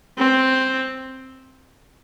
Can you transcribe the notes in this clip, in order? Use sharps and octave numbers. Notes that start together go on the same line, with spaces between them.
C4